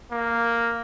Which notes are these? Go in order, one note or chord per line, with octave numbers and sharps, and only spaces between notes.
A#3